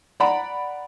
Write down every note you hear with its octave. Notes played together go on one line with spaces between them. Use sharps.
D5 F#5 A#5 B5